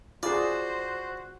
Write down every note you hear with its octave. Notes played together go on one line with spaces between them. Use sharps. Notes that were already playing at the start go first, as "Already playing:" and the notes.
F4 F#4 G#4 C5 D5